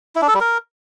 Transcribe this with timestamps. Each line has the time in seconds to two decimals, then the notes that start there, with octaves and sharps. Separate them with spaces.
0.15 E4
0.22 D4
0.28 A4
0.34 G3
0.41 A#4